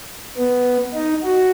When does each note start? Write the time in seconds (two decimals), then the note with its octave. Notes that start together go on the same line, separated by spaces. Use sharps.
0.37 B3
0.94 D#4
1.23 F#4